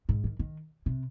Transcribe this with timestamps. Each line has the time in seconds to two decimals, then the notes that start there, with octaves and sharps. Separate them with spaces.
0.09 G#2
0.24 D#3
0.39 D#3
0.86 C3